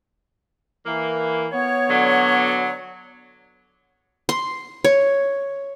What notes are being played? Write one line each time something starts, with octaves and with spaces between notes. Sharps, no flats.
E3 A#3
B3 C#5
D3 F#3
C6
C#5